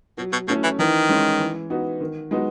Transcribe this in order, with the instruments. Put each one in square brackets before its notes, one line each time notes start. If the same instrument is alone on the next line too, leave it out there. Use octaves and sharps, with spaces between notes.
[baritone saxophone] B2 [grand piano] F#3
[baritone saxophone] B2
[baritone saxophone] B2 [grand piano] A3 C#4 E4
[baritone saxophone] E3
[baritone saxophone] D#3 [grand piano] E3
[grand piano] G#3 C#4 E4
E3
B3 D#4 F#4
D#3
G#3 B3 D#4 F#4